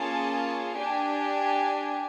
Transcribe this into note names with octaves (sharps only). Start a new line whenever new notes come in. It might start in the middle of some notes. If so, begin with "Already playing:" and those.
Already playing: A#3 C#4 F4 G#4 A5
D4 G4 G#5